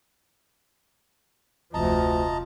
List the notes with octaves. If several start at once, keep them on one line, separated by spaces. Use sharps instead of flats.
F1 D2 F3 D#5 A5 A#5